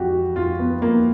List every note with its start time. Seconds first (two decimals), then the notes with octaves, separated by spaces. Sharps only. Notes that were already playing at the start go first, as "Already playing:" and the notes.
Already playing: F2 E3 F#4 G4
0.36 F2 F4
0.59 B3
0.81 F2 A#3